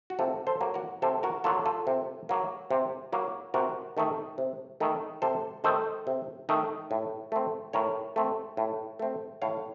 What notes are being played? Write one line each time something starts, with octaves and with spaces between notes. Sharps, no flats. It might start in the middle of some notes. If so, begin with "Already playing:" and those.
F#4
C3 F4 A4
A4 C5
F#3 A#3
F#4 A#4
C3 A4 C5
F#4 A#4
F#3 A#3 F4 A4
F4 A4
C3
F#3 A#3
C3
F#3 A#3
C3 F#4 A#4
D#3 A3 D#4
C3
D#3 A3 D#4
C3 A4 C5
D#3 A3 D#4 A4 C5
C3
D#3 A3 D#4
A2
A3 C4
A2 A#4 C#5
A3 C4
A2
A3 C4
A2 C#5 F5